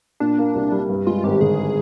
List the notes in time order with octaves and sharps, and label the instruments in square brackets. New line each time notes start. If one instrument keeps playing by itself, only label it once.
[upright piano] A#2 [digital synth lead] D4
[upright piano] A#3
C2
G3
G2
[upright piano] G#3 [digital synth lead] F4
[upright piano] G#1 [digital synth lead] G4
[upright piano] D3 [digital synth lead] G#4